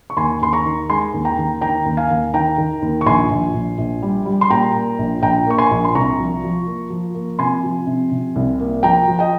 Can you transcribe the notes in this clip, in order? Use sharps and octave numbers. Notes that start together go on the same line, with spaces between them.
C#6
D#2 G#5 C6
D#2 C6
A#5 C#6
D#3
G#3 G#5 C6
D#2
G5 A#5
D#2
D#3 G5 A#5
D#2
F5 G#5
D#2
D#3 G5 A#5
D#3
D#2
C#6
A#1 G#5 C6
A#1
A#1
A#1
G3
G3
C6
A#2 G5 A#5
A#3
A#1
A#1 G5 A#5
A#3 C#6
G#5 C6
A#1
C6
C2 A#5 C#6
F3
F3
A#3
F3
A#3
C3 G#5 C6
F3
C3
C3
C2
A#3
F3 G5 A#5
F3
D#5 G5